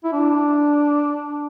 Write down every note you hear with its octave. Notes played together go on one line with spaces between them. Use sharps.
E4
D4